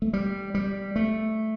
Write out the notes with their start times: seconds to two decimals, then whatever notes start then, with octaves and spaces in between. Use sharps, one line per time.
0.02 A3
0.13 G3
0.55 G3
0.96 A3